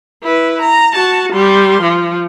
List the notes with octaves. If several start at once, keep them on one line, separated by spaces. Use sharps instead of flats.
E4 B4
A#5
F#4 A5
G3 C6
F3